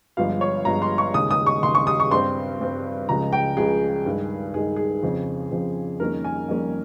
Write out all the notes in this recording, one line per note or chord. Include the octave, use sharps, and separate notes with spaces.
G1 G2 F3 G#3 F5
C#5
G1 G2 F3 G#3 A#5
C6
C#6
D#2 C#3 G#3 D#6
D#6
C#6
D#2 C#3 G#3 C6
C#6
D#6
C#6
G2 G3 C4 C6
G2 G3 C4
C#2 C#3 F3 G#3 A#5
G5
C#2 C#3 F3 G#3 G#4
G2 D#3 G#3
G2 D#3 G#3 G#4
G#4
F2 C#3 F3 C4
F2 C#3 F3 C4
F2 D#3 G3 A#3 C#4 A#4
G#5
F2 D#3 G3 A#3 C#4